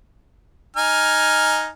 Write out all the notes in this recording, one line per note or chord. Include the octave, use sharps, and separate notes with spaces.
D#4 G#5 F6